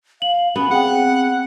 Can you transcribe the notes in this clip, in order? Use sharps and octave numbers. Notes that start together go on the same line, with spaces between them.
F5 F#7
B3 C#4
C4 G#4 F#5 G5